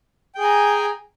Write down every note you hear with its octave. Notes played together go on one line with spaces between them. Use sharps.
G#4 G5 G#5 A#5